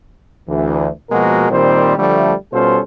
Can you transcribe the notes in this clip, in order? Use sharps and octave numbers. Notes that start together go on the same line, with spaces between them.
D2 E3
B2 F3 G#3 A#3 F#4 A#4
A#2 D#3 G3 C4 G4 C5
D3 F3 G3 A3
B2 G3 C#4 F4 A4 C5